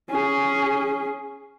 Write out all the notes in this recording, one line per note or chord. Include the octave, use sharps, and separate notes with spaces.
C#4 G#4